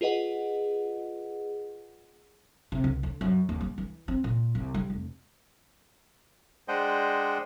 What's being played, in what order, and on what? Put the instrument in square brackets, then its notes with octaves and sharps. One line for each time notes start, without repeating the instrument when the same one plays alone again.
[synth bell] F4 G#4 B4 D#5 F#5
[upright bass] C3
C#2
D3
F#2
D#2
G3
E3
C4
A#2
C2
G3
F1
[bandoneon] G#3 D4 C5 D#5 F#5 G5